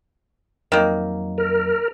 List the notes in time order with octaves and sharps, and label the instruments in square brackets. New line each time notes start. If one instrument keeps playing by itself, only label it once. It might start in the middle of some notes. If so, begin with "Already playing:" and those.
[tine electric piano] F2 F#3 [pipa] D#3 A#3
[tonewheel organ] A#4